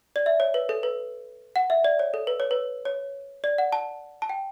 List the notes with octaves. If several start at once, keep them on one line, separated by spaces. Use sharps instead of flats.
D5
E5
C#5
B4
A4
B4
F#5
E5
D5
C#5
A4
B4
C#5
B4
C#5
D5
F#5
A5
A5
G5